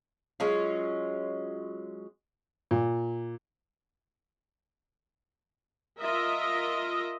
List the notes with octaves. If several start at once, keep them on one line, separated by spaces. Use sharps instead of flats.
F#3 G#3 C#4 F4
A#2
F4 A#4 D#5 E5